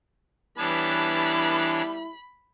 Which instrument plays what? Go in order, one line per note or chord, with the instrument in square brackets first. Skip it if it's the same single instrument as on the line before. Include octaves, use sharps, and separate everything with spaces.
[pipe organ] E3 D4 C#5 [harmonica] G3 B3 A5 [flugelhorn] E4 [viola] B5